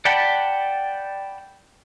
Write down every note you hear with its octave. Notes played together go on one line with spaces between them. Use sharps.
D5 F#5 G5 A5 B5